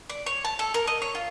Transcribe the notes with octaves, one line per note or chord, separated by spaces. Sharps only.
D5
C#5
A5
A4
A#4
D#5
C#5
F4